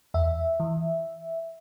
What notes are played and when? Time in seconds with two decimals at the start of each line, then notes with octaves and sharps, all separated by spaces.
0.14 E2 E5
0.60 E3